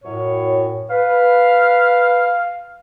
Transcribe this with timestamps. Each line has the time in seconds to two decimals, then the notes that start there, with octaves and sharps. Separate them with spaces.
0.04 F#2 A2 C#5
0.90 B4 F5